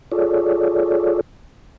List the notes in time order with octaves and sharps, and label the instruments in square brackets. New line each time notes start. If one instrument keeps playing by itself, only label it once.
[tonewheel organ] F4 G#4 A4 C#5 D5